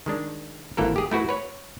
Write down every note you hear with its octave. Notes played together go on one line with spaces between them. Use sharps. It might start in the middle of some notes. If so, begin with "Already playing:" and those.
D#3 G#3 D4
G#1 E3 A#3 A4 A#4
G4 G#4
A3 E4 F#4 B4
B4 C#5